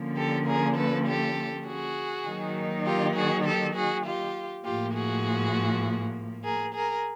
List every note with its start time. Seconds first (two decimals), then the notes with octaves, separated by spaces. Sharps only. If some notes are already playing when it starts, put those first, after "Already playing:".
Already playing: D3 F3 A#3 C#4
0.16 G4 A4
0.46 G#4 A#4
0.76 A4 B4
1.06 G4 A4
1.66 F#4 G#4
2.26 D#3 F#3 A#3 D#4
2.85 F4 G4
3.15 F#4 G#4
3.45 G4 A4
3.75 F#4 G#4
4.05 F4 G4
4.64 A2 F3 A#3 F4 G4
4.95 F#4 G#4
6.44 G#4 A#4
6.74 G#4 A#4